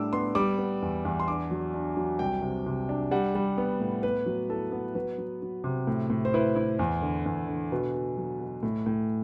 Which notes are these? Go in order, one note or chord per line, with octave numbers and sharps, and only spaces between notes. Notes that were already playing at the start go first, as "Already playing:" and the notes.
Already playing: A2 G3 D4 D6 E6
B3 C6
G3 D6
B3
E2
E2
C6
D4 D6
F#3
D4
F#3
C2 G5
C3
C3
D4
G3 F#5
G3
B3
A2
B3 B4
F#3
E4 A4
B3
F#3 B4
F#3
F#3
C3
A2
A2
C5
E4 B4
E4
E2
D3
E2
D3
B2 B4
B2
F#3
B2
A2
A2